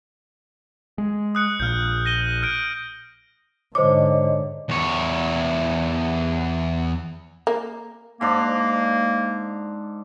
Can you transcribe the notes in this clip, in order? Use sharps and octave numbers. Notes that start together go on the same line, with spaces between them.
G#3
D#6 F#6 C#7
A#1 A#2 F6 G6
A#6 D#7 G7
F6 G6 D7
G#2 D3 C5 C#5 D#5 D6
E2 C#5
A#3
G#2 A#3 D4